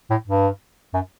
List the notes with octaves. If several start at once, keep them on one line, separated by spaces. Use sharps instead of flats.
A2
G2
F#2